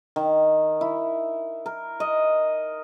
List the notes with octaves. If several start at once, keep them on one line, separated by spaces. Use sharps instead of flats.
D#3
E4
A#4
D#5